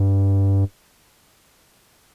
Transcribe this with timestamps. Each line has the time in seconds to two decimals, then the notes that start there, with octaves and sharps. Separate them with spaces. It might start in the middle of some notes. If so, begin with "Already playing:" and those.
Already playing: G2